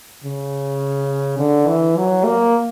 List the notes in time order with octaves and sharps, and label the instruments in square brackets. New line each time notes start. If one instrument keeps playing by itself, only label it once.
[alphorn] C#3
D3
E3
F#3
A#3